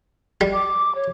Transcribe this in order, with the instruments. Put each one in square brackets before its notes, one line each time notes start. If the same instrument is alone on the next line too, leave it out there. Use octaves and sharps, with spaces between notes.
[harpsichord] G3
[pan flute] D6
C#5